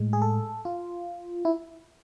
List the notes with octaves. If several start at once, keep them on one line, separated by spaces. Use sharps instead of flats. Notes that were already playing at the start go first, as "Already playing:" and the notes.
Already playing: A2 G#3
G#4
A4
F4
E4